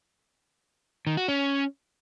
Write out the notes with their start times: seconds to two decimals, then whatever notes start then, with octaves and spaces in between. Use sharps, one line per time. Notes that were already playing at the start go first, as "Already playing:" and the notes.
1.07 D#3
1.17 F#4
1.28 C#4